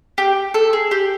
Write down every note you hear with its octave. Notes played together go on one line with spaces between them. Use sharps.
G4
A4
G#4
G4